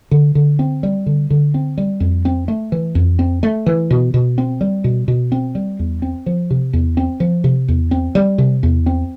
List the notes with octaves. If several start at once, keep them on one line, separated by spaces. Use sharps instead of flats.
D3
D3
C4
G3
D3
D3
C4
G3
F2
C4
A3
E3
F2
C4
A3
E3
B2
B2
C4
G3
B2
B2
C4
G3
E2
C4
F3
C3
E2
C4
F3
C3
E2
C4
G3
C3
E2
C4